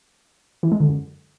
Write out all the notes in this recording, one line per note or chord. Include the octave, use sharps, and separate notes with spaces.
E3
G#3
D3
F#2